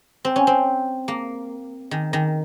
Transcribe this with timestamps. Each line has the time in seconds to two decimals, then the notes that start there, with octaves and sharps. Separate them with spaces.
0.25 C4
0.36 C#4
0.47 C4
1.08 A#3
1.91 D#3
2.13 D#3